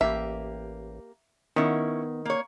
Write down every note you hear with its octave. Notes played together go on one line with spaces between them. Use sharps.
A1 A#3 G4 E5
D#3 B3 C#4 E4
A#3 C#5